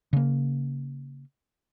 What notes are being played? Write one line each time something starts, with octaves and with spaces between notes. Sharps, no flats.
C#3 A#3